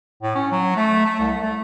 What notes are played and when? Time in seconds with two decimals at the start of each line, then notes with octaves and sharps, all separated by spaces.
0.23 A2
0.35 C#4
0.52 F#3
0.76 A3
1.06 A3
1.19 C2
1.41 A3